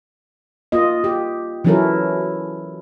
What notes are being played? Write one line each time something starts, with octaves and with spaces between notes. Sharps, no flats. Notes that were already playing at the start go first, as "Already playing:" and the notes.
A#3 F4 D#5
G4
E3 F#3 C#4 E4 A4 A#4